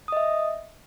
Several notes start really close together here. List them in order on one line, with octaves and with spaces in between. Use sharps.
D#6 D#5 E5